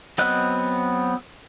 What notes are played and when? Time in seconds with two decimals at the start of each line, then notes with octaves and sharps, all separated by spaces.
0.18 F#3 B3 C4 D#5 F#6